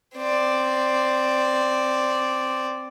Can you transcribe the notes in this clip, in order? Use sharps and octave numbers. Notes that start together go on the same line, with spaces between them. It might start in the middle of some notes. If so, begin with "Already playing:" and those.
C4 D5